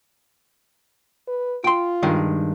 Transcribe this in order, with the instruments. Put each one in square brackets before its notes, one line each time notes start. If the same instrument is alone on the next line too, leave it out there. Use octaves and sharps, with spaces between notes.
[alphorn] B4
[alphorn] F4 [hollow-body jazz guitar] G5 C6
[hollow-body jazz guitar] G2 D#3 G#3